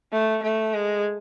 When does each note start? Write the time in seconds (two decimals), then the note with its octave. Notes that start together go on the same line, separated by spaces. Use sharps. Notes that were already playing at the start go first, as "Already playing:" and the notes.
0.13 A3
0.43 A3
0.74 G#3